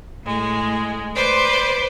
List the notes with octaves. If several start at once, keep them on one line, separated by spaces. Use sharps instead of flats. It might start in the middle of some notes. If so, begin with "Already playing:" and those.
A2 G#3
B4 C5 D5 C6